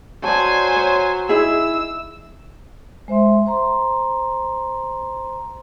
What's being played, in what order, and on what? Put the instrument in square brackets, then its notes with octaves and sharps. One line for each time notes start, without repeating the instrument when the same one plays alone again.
[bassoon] F#3 [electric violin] C5 G#5 [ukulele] D5 A5
[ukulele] C#5
[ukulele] D#4 E4 G#4 [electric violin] E6
[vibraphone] G#3 C5 E5 C6
C5 A#5 C6